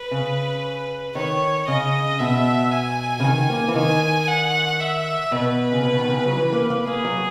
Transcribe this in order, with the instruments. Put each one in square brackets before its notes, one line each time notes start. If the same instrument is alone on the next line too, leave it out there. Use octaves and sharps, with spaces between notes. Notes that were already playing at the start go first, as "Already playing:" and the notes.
Already playing: [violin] B4
[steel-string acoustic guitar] C#3
[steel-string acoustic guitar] D#3 [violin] C#5
[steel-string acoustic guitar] C#3 [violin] D#5
[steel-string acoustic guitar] B2 [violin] E5
[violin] G#5
[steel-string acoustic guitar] C#3
D#3
A#3
E3
[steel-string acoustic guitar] D#3 [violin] G#5
[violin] F#5
E5
[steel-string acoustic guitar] B2 [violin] B4
[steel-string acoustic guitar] C#3
B2
D#3
C#3
F#3
E3
A#3
A#3
[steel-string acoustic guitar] A#3 [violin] G#4
[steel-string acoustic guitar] F#3